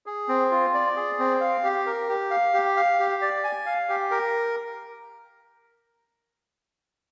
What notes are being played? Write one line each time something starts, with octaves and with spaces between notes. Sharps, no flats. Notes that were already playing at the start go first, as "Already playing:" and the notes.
G#4
C4
F4
D5
G#4
C4
F5
G4
A#4
G4
F5
G4
F5
G4
D5
G#5
F5
G4
A#4